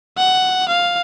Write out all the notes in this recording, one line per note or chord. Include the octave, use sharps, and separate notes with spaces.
F#5
F5